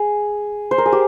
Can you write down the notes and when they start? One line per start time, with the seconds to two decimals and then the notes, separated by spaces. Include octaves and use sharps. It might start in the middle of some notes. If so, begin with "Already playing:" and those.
Already playing: G#4
0.71 C5
0.78 A#4
0.86 G#4
0.92 G4